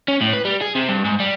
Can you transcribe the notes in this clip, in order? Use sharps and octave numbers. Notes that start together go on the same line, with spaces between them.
C#4
A2
B4
G3
G#4
C3
G2
G#2
G3